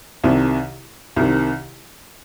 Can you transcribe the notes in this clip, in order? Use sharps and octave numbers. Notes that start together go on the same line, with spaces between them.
C2 C3 D#3
C2 C3 D#3